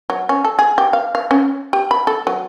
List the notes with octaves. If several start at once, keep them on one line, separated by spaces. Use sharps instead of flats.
F#3
C#4
A4
G#4
G4
F5
F5
C#4
G4
B5
A4
F#3